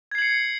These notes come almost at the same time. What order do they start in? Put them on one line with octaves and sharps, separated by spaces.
G#6 C7 F#7 C#7